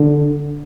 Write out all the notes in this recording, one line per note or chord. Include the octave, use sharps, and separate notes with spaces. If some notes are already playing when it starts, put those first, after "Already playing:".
Already playing: D3